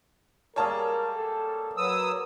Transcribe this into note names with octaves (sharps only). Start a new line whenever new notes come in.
G3 A#3 G#4 A#4 C#5 A5
A4
F#3 B4 D#6 E6